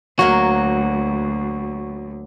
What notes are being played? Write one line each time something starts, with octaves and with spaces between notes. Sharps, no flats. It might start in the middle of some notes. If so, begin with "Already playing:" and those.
D2 F#3 A#3 F#4 F5